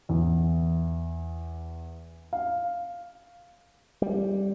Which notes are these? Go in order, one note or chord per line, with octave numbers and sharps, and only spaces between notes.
E2
F5
G3